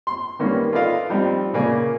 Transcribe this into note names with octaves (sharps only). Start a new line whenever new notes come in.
C6
D#3 G3 A#3 B3 C#4
F4 A4 B4 D5 D#5 F5
F3 G3 C4 D#4
A#2 C#3 A#3 D5 G#5